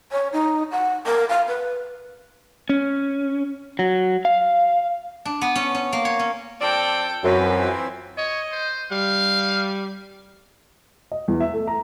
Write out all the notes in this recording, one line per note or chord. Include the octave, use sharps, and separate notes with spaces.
C#5
D#4
F#5
A#4
F5
B4
C#4
F#3
F5
D4
B3
C#4
C#4
A#3
C#5
C#4
F3 C4 A4 D5 G5
F#2 E3 F3 C4 B4
C#5 D#5
C5
G3 F5
D#5
E2
E5
A3
A#5